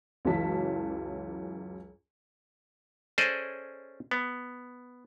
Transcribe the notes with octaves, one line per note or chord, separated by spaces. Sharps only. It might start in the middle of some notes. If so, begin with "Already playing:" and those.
C#2 F#2 E3 F#3 A5 B6
C#4 G#4 A4 C5 D5 D#5
B3